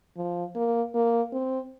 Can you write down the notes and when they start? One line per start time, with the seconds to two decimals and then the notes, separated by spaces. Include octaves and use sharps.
0.17 F3
0.55 A#3
0.94 A#3
1.32 C4